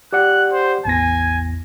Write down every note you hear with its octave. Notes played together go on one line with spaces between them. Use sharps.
G4 D5 F#5 F#6
C5
A1 E2 G#5 A#6